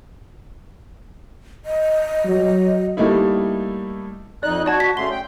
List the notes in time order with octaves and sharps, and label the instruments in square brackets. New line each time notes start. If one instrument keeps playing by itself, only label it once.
[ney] D#5
[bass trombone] F#3
[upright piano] G3 A3 A#3 D#4 E4
[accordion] F2 D#4 F#6 [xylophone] D5
[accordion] F#4 [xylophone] D5 A5 G#6
[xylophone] B6
[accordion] C#3 A3 C6 [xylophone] G7
[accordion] G5